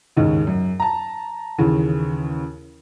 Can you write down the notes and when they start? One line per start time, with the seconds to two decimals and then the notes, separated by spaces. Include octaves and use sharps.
0.16 D#2 G#2 C#3 D#4
0.47 F#2
0.80 A5 A#5
1.58 D#2 C#3 E3